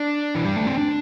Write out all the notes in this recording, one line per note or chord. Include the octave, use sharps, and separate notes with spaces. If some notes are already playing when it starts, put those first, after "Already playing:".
Already playing: D4
E3
G3
A3
C4
D4